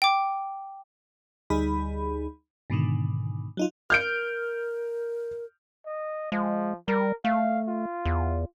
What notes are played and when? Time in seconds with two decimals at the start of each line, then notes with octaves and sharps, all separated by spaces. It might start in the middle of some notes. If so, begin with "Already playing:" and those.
0.02 G5 D6
1.50 D2 G3 D#4 G#4 B5
2.70 G#2 B2 D3 D#3
3.57 F#3 D#4 F4
3.90 A#4 F6 G6 D7
5.86 D#5
6.32 F3 G#3
6.88 G3 A#4
7.25 A3 F5
7.68 F4
8.05 E2